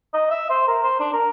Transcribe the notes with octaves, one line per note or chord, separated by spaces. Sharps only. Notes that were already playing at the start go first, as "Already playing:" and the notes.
D#5
E5
C5
A#4
C5
D4
A#4